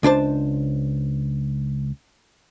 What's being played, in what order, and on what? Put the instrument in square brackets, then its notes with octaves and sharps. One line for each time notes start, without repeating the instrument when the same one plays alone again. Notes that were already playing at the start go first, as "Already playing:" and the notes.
[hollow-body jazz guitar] C#2 D4 C5 A5